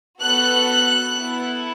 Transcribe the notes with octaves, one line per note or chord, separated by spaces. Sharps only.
B3 F#4 A4 F#6
B3 E4 A4